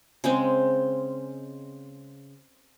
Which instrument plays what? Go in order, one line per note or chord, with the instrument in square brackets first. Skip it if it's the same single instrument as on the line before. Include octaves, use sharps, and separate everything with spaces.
[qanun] C#3 G#3 C4